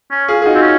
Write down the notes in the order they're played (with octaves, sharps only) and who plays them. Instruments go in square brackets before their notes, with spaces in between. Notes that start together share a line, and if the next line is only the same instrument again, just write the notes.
[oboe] C#4
[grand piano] F4 G#4
G#4
D#4 F#4
[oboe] C4
C#4